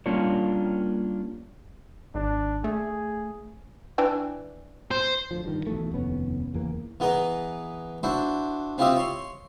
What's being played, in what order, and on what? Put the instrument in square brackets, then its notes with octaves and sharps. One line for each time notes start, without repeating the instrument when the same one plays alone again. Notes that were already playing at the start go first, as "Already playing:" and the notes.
[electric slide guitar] G3 A#3 C#4 D4 F4 C#5
[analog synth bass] G#1 [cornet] D4
[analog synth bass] A3 [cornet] G#4
[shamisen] E3 D4 G5
[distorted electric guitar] C5
[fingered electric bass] D2 F3
G2 D#3
B1 E3 A3
F1 D#2 B3 C#4
F#1 E2 E3 A#3
[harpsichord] E3 B3 G#4 D#5 A#5
D4 E4 F#4 C5
C4 E4 F4 G4 D#5 E5
C#5 C6